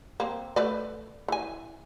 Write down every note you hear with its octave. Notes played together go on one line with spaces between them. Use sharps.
A#3 C4
A3 B4 D5
E3 G#5